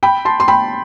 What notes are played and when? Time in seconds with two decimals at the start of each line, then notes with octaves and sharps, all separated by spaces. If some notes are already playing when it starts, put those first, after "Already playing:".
0.03 G5 B5
0.25 A5 C6
0.40 C6
0.48 G5 B5